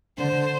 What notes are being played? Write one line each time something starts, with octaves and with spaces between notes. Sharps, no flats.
D3 C5